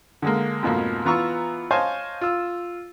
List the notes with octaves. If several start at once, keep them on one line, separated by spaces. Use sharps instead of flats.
D3 G#3 A#3
F2 G#2 B2 F3 A3 A#3
E3 B3 F4 A#5 C#6 E6
C5 C#5 D#5 F5 G#5 A5
F4 E6